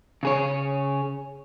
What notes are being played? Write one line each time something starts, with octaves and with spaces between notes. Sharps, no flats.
C#3 G#4 C#5